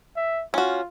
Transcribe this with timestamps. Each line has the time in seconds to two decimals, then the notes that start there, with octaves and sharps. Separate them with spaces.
0.17 E5
0.54 C#4 F4 F#4